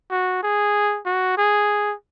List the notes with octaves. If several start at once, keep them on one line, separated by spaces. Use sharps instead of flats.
F#4
G#4
F#4
G#4